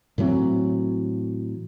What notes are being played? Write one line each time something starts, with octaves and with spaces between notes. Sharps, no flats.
A2 E3 F#3 C4